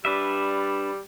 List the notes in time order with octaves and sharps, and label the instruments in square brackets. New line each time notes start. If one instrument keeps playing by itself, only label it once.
[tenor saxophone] G3 [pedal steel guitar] D4 B4 E5